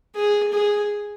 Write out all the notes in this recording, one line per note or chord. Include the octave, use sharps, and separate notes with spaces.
G#4
G#4